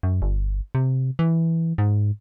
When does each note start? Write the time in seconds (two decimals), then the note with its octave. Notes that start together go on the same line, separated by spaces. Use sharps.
0.03 F#2
0.22 G1
0.75 C3
1.19 E3
1.78 G#2